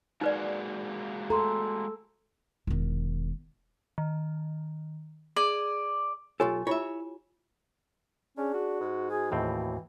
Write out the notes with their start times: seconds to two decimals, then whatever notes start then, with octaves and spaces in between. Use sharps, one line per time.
0.21 G#3 A#3 D#4 F#4 B4 D5
1.30 A4 A#5 C6
2.67 E1 D#3
3.98 D#3
5.36 G#4 D5
6.40 B1 F4 G4 A4 C#5 G#5
6.67 E4 F4 C#5 E5
8.38 C#4 D4 G#4
8.54 F#4
8.81 G#2
9.11 F#4 G#4
9.32 D#2 A2 E3 C4